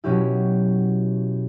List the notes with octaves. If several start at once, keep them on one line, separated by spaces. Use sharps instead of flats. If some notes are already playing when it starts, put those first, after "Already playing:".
B2 F#3 C#4 E4 G4